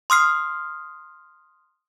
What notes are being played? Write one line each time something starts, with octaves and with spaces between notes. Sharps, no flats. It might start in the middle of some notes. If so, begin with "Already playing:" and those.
C6 D#6 F6 C7